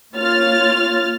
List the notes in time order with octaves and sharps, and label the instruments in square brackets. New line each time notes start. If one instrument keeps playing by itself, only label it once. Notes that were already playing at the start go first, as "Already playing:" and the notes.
[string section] A#3 F4 C#5 F6 A6